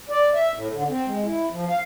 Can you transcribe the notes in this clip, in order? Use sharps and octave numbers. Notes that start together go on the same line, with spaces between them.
D5
E5
A2
D3
C4
G#3
E4
F3
F5